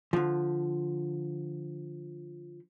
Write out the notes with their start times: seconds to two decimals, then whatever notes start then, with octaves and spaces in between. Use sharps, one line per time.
0.13 D3 F3